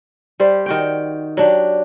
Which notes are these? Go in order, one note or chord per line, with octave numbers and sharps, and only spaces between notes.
G3 G4 C5
D#3 F#4 G5
F#3 D4 G4